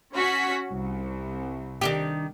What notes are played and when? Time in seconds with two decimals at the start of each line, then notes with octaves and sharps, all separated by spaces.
0.16 C#4 F#4 B6
0.71 C2
1.81 D#3 D4 G4